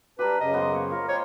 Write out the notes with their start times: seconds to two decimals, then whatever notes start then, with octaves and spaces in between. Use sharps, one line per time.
0.19 G3 D4 G4 A#4 B4
0.41 F#2 C#3 D#5
0.54 B3 C5
0.72 A#3 C#5
0.91 F4 A#4
1.08 C4 C5 C#5 D#5 C6